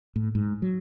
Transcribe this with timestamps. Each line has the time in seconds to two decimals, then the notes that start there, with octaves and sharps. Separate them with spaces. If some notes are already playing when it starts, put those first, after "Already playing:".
0.16 A2
0.35 G#2
0.62 F#3